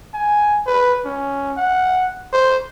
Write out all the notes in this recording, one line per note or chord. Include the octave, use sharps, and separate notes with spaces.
G#5
B4
C#4
F#5
C5